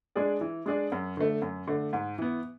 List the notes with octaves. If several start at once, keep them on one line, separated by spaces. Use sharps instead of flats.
G#3 D4 G#4 D5
E3
G#3 D4 G#4 D5
F#2
D3 A3
F#2
D3 A3
G#2
E3 B3